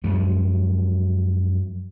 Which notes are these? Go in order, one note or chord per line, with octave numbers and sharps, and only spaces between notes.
F#2 F3 F#3 G#3